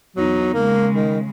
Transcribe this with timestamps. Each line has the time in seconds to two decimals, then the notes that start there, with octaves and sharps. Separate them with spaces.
0.16 E2 F#3 D#4
0.54 C#3 G#3 A#3
0.94 D#3